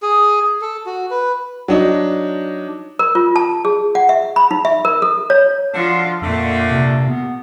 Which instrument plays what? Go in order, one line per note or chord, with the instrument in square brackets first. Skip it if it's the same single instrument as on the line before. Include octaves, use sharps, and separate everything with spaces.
[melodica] G#4
A4
F#4
B4
[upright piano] F#3 D4 D#4
[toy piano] A#4
F4
A5
G#4
F#5
E5
B5
D#4
E5
A#4
A4
C#5
[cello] F3 F4 [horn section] D4 F#4 A4
[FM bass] F2 [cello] A#2 A#3 [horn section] D3 A3
[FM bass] C3
B3